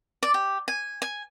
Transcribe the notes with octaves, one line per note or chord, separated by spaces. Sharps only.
D5
G4
G#5
G#5